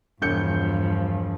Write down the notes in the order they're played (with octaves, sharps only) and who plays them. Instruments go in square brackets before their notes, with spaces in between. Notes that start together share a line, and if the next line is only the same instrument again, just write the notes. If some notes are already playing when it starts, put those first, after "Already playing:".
[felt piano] E1 G6 C#7 [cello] G2 F3